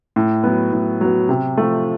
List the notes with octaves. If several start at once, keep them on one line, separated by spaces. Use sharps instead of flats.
A2
F#3 B3
A2
F#3 B3
C3
F3 A3